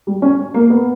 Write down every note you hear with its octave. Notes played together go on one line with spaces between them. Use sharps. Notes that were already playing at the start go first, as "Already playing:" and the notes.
G3
C#4
A#3
B3